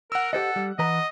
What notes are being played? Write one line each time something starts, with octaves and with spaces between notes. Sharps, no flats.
A#4 F#5 E6
G4 A4 C5 D#5
G3
E3 B4 D#5 A#5